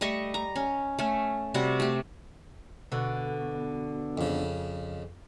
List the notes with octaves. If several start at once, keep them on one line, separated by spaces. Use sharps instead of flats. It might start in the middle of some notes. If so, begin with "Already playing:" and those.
G3 A3 D#5 C#6
A#5
C#4
A3 C#4
C3 G3 F#4
A3 G4
B2 D3
F2 C#3